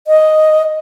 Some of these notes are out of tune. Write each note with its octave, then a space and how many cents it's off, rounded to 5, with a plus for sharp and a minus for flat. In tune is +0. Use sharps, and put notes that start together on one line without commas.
D#5 +0